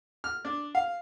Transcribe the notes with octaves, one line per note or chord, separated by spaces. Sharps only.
F6
D4
F5